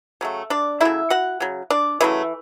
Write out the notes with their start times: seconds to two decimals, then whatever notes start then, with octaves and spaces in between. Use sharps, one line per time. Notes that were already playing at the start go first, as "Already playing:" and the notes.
0.21 C#3 F#3 A3
0.50 D4 D5
0.80 C#3 F#3 A3 E4 E5
1.10 F#4 F#5
1.40 C#3 F#3
1.70 D4 D5
2.01 C#3 E3 F#3 A3 E4